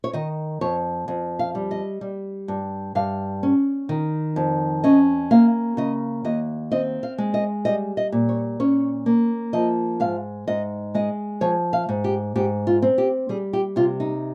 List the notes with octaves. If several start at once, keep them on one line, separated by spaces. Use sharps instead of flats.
C#5
D#3 D#5
F2 C#5
F2
F5
G3
D#5
G3
G2
G2 F5
C#4
D#3
F2
C#4 D#5
A#3 F5
C#3 D#5
D#2 D#5
C4 D#5
F5
G#3
D#5
G3 D#5
D#5
A#2
C#5
C#4 C#5
A#3
F3 D#5
G#2 F5
G#2 D#5
G#3 D#5
F3 C#5
F5
G#2
G4
G#2 G4
F4
C4
G4
G3 G#4
G4
C3 F4
D#4